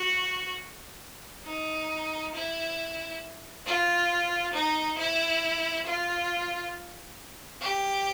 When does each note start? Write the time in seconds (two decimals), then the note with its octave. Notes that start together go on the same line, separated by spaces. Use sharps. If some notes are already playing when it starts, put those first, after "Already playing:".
Already playing: F#4
1.46 D#4
2.34 E4
3.66 F4
4.53 D#4
4.98 E4
5.86 F4
7.62 G4